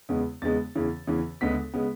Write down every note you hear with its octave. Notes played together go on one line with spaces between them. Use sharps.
E2 C#3 G#3 B3
E2 C#3 G#3 B3 A6
E2 C#3 E3
E2 C#3 E3
D2 C#3 G#3 B3 B6
C#3 G#3 B3